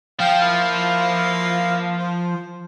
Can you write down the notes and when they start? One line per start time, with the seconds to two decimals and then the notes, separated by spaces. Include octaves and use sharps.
0.20 F3 F5 G5
0.41 A#3 E4 F5
1.96 C5